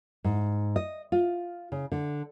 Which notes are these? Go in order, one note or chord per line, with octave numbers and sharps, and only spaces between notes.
G#2
D#5
F4
C#3
D3